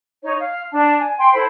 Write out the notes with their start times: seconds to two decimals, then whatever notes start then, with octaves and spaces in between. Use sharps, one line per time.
0.24 D#4 C#5
0.39 F5
0.73 D4 A5
0.99 G#5
1.19 G5 C6
1.34 E4 A4 C5 B5